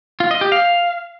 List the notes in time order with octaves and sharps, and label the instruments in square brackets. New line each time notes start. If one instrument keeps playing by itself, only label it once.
[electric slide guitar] F4
D#5
G4
F5